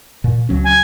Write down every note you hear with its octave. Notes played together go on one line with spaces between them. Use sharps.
A#2
C#2 F#3 C#4
G#5